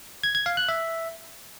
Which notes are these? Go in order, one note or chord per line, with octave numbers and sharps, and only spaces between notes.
G#6
G#6
F5
F#6
E5